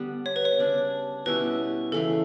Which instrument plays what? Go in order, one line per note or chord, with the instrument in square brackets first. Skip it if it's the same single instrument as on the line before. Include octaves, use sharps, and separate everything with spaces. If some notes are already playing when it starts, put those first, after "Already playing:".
Already playing: [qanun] D3 G3 B3
[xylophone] C#5
B4
C#5
[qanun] C#3 G3 D4
[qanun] B2 G3 C#4 E4 [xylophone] B4
[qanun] C#3 E3 A3 [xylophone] A4